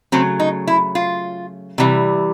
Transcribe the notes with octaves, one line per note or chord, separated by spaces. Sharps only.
C#3 F#3 A3 C4
D#4
E4
F4
C3 E3 G3